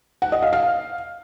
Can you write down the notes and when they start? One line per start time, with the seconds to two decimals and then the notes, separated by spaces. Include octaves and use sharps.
0.22 F#5
0.32 D#5
0.42 F5
0.53 F5